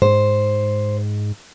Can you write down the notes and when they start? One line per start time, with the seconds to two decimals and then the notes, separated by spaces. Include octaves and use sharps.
0.02 G#2 C5